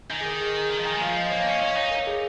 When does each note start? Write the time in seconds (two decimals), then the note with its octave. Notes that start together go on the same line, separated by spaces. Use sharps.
0.10 D#3 G#5
0.21 G#4
0.25 A#4
0.41 G#4
0.56 A#5
0.70 D#3 A#5
0.78 F3
0.86 D#3 G#5
0.96 G#3 G#5
1.01 F3 F5
1.16 D#5
1.31 A#3 C#5
1.40 F5
1.46 C#4 D#5
1.62 C#4 F5
1.77 D#4 C#5
1.91 A#4
2.07 G#4